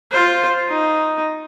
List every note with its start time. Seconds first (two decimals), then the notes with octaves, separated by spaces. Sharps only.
0.12 F4 C5
0.69 D#4